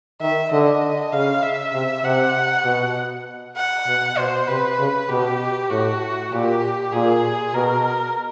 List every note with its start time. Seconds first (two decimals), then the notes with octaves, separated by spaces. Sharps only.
0.21 D#3 E5
0.52 D3 D#5
1.12 C#3 F5
1.43 E5
1.73 C3
2.04 C3 F#5
2.65 B2
3.57 F#5
3.87 B2
4.17 B2 C5
4.48 C3 B4
4.79 C#3
5.09 B2 G4
5.70 A2 F#4
6.32 A#2 G4
6.92 A#2 G#4
7.54 B2 A#4